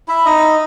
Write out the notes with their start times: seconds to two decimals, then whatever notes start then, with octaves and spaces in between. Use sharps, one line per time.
0.08 E4 E5
0.25 D#4 D#5